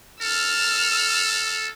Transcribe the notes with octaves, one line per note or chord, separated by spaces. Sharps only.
A4 E6 F6